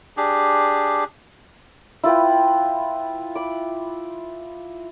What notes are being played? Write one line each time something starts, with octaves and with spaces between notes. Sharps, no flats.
D4 G4 G#4
E4 F4 B4 G5
B5 D6